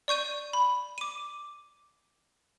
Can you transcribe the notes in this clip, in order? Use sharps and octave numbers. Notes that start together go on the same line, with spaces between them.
D5 C#6 G6 D#7
B5
D6 D#7